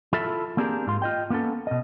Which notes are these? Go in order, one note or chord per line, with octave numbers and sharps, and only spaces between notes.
E4 F4 A4 E5
A#3 C4 D4 G4 G#4 A#4
G#2 F4 C6
F4 D#5 G5
A#3 B3 C#4 A4
B2 D#5